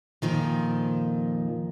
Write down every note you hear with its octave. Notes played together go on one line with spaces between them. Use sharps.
F2 A#2 D#3 F3